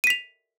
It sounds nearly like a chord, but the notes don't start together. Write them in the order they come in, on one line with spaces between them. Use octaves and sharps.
D#7 B6 F7